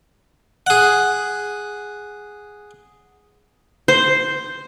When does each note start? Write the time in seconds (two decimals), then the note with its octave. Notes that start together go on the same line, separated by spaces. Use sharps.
0.67 G#4 F#5
3.88 C5